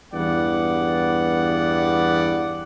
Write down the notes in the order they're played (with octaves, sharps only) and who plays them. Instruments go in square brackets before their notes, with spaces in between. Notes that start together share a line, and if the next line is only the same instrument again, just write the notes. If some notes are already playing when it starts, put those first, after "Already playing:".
[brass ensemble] E2 G2 B3 D5 F#5